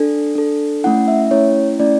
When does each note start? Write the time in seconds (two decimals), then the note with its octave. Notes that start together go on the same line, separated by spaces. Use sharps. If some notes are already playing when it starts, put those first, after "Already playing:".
Already playing: D4 A4
0.35 D4 A4
0.84 A3 C#4 E4 F#5
1.08 E5
1.31 A3 C#4 E4 C#5
1.79 A3 C#4 E4 D5